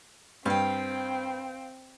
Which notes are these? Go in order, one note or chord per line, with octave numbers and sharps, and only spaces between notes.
G2 C4 F5 G5